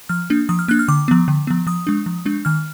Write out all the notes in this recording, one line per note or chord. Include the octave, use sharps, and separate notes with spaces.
F3 F6
A#3 D4
F3 D#6
F6
A#3 D4 F#6
F6
D3 D6
F3 B3
D3
F3 B3
F3 D#6
G#3 D4
F3
G#3 D4
D#3 F6